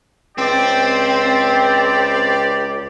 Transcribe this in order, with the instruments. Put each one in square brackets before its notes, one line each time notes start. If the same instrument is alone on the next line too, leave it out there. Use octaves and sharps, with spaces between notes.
[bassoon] C#2 [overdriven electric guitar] C4 [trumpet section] G4 D5